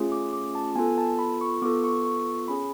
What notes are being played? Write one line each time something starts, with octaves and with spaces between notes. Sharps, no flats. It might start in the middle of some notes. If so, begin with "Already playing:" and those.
Already playing: A3 C#4 F4 G#4
D6
D6
A5
B3 F4 A4 G#5
A5
B5
C#6
B3 F4 A4 D6
C#6
C#6
C#4 G#4 B5